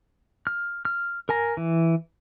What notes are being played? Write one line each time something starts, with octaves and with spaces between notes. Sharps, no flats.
F6
F6
A#4 G#5 A#5
E3